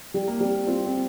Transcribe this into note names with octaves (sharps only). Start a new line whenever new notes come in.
G3
A#3
G3 C4
C4 F4
C4